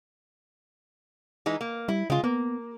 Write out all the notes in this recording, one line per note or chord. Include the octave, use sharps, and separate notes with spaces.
E3 G#3 D#4
A#3
G3 E4
C#3 G#3 F4
A#3 B3